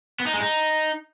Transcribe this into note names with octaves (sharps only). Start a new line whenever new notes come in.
B3
D#4
G#3
D#4